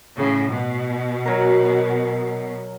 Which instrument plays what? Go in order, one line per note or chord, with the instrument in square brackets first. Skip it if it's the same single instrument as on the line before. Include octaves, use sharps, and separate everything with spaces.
[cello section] A2 C#3
B2
[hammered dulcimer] F#3 A#4